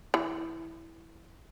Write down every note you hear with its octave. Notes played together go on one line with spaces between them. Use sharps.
E3